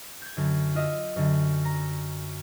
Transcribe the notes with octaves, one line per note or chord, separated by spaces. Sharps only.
G6 G#6
F#2 D3
F4 D#5 E5
F#2 D3
A#5